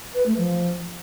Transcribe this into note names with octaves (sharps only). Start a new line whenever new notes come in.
B4
A3
F3